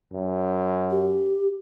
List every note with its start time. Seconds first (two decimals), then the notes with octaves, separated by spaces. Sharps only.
0.13 F#2
0.91 G4